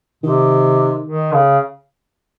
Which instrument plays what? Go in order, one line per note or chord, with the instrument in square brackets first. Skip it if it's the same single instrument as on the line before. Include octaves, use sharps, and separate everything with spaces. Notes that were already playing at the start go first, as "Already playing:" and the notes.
[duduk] C3 [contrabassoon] D#3
[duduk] D#3
C#3